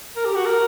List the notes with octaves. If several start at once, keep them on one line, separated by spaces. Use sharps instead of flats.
A#4
G4
F#4
A#4